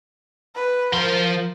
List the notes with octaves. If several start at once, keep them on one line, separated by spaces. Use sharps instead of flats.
B4
F3 A#4 C5 C6